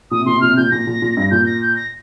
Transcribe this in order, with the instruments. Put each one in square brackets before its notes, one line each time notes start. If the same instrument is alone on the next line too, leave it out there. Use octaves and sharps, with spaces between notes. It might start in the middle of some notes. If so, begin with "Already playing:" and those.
[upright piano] A#2 [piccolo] D#6
[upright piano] C3
[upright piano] A#2 [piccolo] C6
[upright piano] C3
[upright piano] A#2 [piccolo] F6
[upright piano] C3
[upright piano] A#2 [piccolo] G6
[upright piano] A#2 [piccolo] A#6
[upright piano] A#2
A#2
G2
[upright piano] A#2 [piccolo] G6
[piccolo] A#6
G6
A#6